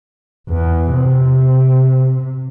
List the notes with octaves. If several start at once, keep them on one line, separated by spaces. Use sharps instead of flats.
E2
C3